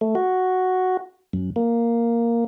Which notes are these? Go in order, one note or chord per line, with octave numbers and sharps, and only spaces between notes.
A3
F#4
F#2
A#3